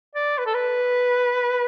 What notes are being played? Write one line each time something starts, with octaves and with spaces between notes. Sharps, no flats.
D5
B4
A4
B4